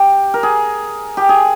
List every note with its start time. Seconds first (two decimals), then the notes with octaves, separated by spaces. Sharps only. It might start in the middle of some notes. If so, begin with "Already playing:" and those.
Already playing: G4
0.34 A#4
0.43 G#4
1.17 G4
1.29 G#4